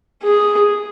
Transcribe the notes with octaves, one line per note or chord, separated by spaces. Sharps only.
G#4